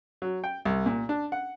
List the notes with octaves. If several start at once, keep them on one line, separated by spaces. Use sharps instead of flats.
F#3
G5
C2
A#2
D4
F#5